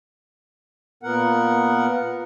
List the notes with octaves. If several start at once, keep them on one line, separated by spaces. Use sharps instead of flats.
A#2 B3 A#4 F#5